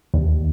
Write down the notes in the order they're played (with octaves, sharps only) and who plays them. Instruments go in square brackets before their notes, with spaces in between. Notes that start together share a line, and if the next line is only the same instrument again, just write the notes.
[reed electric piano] D#2